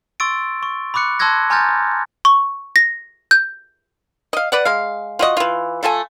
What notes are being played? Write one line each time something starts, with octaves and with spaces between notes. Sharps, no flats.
C6 C#6 E6 A6 D7
C#6
B5 C#6 D6 F#6 C#7
A5 C6 E6 F#6 G#6 A#6
G#5 A#5 C6 F6 G6 A6
C#6
A#6
G6
D#5 F5
B4 D5 F#5
G#3 F5
F4 F#4 D#5
E3 F4
A3 F4 A4 G#5